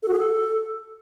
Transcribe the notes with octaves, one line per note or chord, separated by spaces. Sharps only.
A4
F#4
G#4
A4